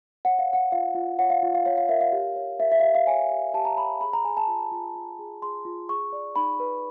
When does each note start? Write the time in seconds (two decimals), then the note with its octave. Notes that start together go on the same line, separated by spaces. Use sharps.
0.25 C#5 F#5
0.39 F5
0.48 C#5
0.53 F#5
0.72 F4 F5
0.95 F4
1.19 C#5 F#5
1.30 F5
1.43 F4
1.54 F5
1.65 C#5 F5
1.77 F5
1.89 A#4 E5
2.01 F5
2.12 G4
2.36 C#5
2.60 A#4 E5
2.72 E5
2.80 F5
2.83 G4 E5
2.95 F5
3.07 C#5 G#5
3.31 G4
3.54 G4 A5
3.65 A#5
3.77 C#5 B5
4.00 G#4 B5
4.13 A#5
4.25 G#4 G#5
4.37 A5
4.47 F4
4.71 F4
4.96 F4
5.19 G#4
5.42 G#4 C6
5.65 F4
5.89 G#4 C#6
6.13 D5
6.36 D#4 B5
6.60 B4